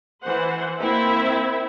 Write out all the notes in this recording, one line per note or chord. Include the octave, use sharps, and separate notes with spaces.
E3 C5 F#5
A#3 C4 E4 E5